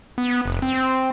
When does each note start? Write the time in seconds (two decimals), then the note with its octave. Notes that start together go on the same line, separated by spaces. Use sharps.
0.18 B3
0.46 F1
0.62 C4